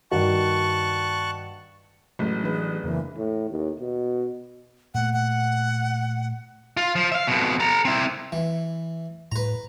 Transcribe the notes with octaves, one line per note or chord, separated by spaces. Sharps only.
G2 D#3 F#4 A5 C#6 F#6
A1 F#3 G#3
E3 D4 G#4 B4
F2 C#3 E3 A#3
A2
D#2
B2
A#2 A3 F#5
F#5
F4
F3
E5 F5
F2 B2
A4 A#5
C4 E4
E3
A2 B4 A#5